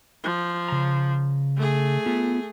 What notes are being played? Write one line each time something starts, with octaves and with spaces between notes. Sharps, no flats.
F3
C#3 A#5
A3 G#4
B3 F4